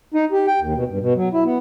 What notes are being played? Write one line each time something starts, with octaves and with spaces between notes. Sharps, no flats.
D#4
G4
G5
D#2
B2
G2
B2
F#3
E4
B3